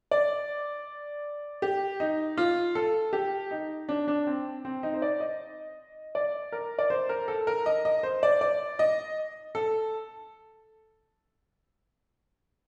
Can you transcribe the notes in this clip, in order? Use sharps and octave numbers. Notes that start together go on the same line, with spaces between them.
D5
G4
D#4
F4
A4
G4
D#4
D4
D4
C4
C4
D#4
C5
D5
D#5
D5
A#4
D5
C5
A#4
A4
A#4
D#5
D#5
C5
D5
D5
D#5
A4